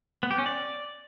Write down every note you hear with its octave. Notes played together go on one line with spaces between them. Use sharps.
B3
G4
C#4
D5